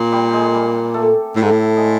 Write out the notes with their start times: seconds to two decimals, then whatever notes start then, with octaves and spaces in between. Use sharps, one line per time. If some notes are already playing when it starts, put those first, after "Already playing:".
Already playing: A#2 A#3 C4 A#4
0.12 G3 G4
0.33 G#3 G#4
0.53 G3 G4
0.94 A3 A4
1.36 A2 A3 A4
1.43 G#2
1.51 A2
1.77 G#3 G#4